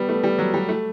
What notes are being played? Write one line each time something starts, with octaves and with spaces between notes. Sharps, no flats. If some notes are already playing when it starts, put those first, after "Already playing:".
Already playing: G3 B3
A3
G3
F#3
G3
A3